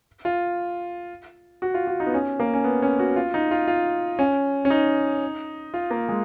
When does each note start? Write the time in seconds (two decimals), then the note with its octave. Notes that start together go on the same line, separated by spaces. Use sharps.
0.25 F4
1.62 F#4
1.74 F4
1.87 F#4
2.00 D#4
2.07 B3
2.14 C#4
2.40 A#3
2.53 C#4
2.64 B3
2.82 C#4
2.99 F#4
3.16 F4
3.34 D#4
3.51 F4
3.67 F4
4.19 C#4
4.65 C#4
4.70 D#4
5.74 F4
5.91 A#3
6.09 G#3